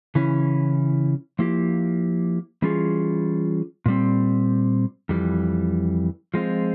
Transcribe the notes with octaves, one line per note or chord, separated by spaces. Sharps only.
C#3 E3 C#4 E4
F3 A#3 E4 G4
E3 G3 C#4 F4 G#4
A#2 G3 C4
F2 E3 G3
F3 G#3 C4 F4